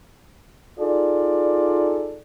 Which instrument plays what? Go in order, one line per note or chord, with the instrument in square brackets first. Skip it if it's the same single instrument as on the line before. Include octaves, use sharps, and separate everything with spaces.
[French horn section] D#4 F4 G#4 A4 D5